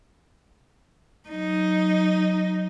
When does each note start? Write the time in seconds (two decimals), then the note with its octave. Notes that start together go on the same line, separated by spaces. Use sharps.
1.29 F#3 D#4